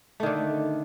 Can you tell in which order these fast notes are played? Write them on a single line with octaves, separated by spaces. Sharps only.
A3 D#3 D3